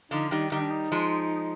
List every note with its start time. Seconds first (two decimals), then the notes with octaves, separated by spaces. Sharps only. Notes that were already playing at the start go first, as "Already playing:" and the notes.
0.11 D3 F3 D#4
0.31 D#3 G3 D#4
0.51 D#3 G3 D#4
0.61 D4
0.70 D#4
0.92 F3 G#3